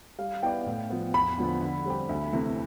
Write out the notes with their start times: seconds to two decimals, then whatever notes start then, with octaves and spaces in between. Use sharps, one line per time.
0.18 G3 F5
0.43 B3 E4 B4 D5 G5
0.66 A2
0.90 F3 B3
1.14 E2 B5
1.38 D3 F3 B3
1.61 D3
1.85 G3 C4 G4
2.09 D2
2.33 C3 E3 A3 E4